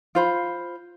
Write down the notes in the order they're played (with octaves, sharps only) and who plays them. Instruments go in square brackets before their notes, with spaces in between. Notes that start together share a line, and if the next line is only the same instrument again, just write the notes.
[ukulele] F4 C5 B5